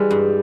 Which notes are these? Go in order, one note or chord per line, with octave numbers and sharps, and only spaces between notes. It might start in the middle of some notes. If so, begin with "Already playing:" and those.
Already playing: E3 G3 G#3
G2